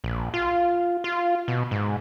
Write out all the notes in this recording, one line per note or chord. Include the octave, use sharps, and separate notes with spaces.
A#1
F4
F4
B2
G#2